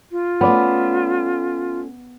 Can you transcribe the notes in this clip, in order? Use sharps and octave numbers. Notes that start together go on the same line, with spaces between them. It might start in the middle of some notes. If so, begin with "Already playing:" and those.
F4
A3 B3 C#4 D5